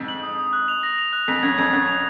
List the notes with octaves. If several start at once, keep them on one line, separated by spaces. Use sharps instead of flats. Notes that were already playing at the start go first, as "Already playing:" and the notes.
Already playing: F2 G#2
F#7
D#6
D#6
F#6
F7
A#6
F7
F#6
F2 B6
F#2 G#6
F2 G#6
F#2 G#6
F7